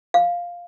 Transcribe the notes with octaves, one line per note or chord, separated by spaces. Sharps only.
F5